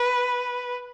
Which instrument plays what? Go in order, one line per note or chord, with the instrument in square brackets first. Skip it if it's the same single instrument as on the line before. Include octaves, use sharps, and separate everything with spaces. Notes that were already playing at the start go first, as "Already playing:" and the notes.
Already playing: [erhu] B4